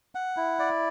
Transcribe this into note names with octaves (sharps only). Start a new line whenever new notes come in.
F#5
E4
D5